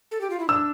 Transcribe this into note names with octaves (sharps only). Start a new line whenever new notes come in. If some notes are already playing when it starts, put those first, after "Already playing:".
A4
G4
F4
E4
D4 E6